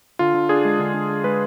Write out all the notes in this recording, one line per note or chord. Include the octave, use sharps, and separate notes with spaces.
D3 F4
D3
D4 G#4
G#3
D3
D3
D4
G#3 B4